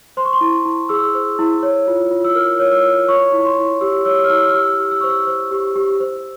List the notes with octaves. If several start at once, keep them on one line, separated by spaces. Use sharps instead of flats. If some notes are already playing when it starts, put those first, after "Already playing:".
C5 C6
C#6
C6
E4
E4
G#4 E6
C5
E4
C#5
F4
F4
E6
A#4 F6
C#5
F6
E6
F4
C#5 C#6
E4
C#6
C6
E4
G4 E6
C#5 E6
F6
E4 E6
F6
G4 E6
G4
E6
C5 C#6
E6
C5
G4
G4
C5